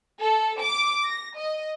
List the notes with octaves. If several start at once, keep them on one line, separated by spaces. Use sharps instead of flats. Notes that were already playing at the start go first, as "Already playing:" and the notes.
A4
D6
A#6
D#5